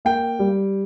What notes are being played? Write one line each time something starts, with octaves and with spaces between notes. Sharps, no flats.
A#3 G5
G3